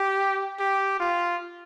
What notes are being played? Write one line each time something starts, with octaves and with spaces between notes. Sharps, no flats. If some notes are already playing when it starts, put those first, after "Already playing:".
Already playing: G4
G4
F4